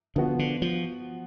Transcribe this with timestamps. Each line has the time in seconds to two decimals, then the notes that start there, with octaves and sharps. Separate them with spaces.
0.16 D3 F3 B3 F#4
0.39 D3
0.62 F3